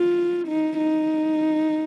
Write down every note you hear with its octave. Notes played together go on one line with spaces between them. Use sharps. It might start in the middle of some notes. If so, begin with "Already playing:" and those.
Already playing: F4
D#4
D#4